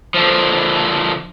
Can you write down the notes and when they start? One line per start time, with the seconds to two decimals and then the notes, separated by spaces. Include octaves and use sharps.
0.14 D3 F3